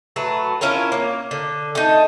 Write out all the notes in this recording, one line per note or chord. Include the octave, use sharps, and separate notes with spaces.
F#3 A3 B4
C#4 E4 F4 A#4
A#3
D3
A3 D#4